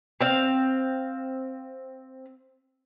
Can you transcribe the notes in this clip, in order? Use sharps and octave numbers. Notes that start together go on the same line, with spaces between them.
C4 F5